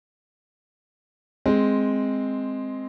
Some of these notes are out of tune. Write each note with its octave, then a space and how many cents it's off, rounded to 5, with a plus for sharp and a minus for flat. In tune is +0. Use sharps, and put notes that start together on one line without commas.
G#3 +0 C4 +0